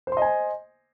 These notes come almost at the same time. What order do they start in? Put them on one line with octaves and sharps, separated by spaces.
C5 C6 D#5 G#5